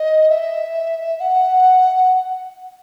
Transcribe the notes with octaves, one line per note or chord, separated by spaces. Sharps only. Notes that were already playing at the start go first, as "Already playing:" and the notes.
Already playing: D#5
E5
F#5